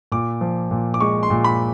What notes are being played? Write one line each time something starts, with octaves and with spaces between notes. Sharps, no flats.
A#2 D6
F3
A#2
D6
G#3 C#6
C6
A#2
B5